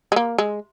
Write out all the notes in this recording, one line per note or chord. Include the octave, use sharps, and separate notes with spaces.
G#3
A#3
G#3